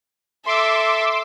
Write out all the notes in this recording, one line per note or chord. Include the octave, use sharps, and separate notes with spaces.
A4 E5 C6 D6 E6